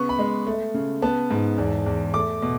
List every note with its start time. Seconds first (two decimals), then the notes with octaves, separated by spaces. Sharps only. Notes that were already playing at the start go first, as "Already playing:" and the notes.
Already playing: C#3 B3 C#6
0.09 B5
0.19 G#3
0.47 A3
0.74 C#3
1.02 B3 A5
1.31 G#2
1.58 E2
1.86 E2
2.14 A3 D6
2.42 B2